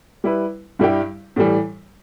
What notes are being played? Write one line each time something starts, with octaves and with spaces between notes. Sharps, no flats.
G3 E4 B4
G2 G3 E4 G4
A2 E3 G3